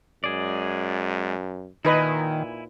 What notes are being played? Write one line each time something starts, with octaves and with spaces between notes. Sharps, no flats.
F#2 G#3 G#4 D5
A#2 D#3 D#4 E4 B4 D#5 G#5